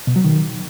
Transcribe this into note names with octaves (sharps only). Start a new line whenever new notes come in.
B2
F#3
D#3